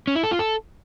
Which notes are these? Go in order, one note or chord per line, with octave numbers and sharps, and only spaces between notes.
C#4
E4
A4
F4
A4